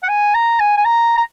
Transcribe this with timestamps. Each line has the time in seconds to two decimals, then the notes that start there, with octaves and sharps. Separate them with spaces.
0.03 F#5
0.08 G#5
0.34 A#5
0.60 G#5
0.77 G#5
0.85 A#5
1.17 A#5